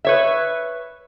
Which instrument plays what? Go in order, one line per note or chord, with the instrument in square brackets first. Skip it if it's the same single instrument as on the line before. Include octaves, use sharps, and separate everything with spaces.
[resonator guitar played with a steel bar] B4 C#5 E5